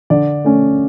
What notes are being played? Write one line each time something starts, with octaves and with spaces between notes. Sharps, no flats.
D3 D5
A3 C#4